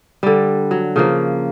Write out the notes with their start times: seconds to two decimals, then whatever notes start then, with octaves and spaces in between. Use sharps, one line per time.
0.23 D3 G3
0.71 F#3
0.96 C#3 F3 A#3